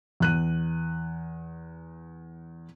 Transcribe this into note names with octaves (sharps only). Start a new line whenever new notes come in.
E2 F#6 D#7